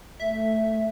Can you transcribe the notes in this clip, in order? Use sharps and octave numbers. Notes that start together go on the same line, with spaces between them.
A3 E5